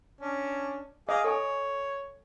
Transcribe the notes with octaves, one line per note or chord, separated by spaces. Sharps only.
C#4 D4
G#4 D#5 F5 D6
A4 C#5 G#5